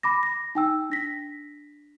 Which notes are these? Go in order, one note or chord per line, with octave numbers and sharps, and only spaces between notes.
B5 D6 A#6
A#6
D#4 G5 E6
D4 A#6 B6